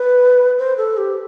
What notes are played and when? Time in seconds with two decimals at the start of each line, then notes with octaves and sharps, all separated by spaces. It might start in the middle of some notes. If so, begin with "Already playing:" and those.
Already playing: B4
0.59 C5
0.78 A4
0.97 G4